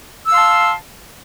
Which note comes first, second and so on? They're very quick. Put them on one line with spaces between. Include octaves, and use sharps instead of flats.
E6 F5 C6 A5